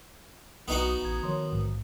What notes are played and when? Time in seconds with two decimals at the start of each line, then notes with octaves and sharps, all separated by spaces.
0.68 B1 B3 D#4 F#4
1.02 A1 F#5 G#6
1.23 D#3 F3 C#5 C6
1.52 A#1 G#2 F3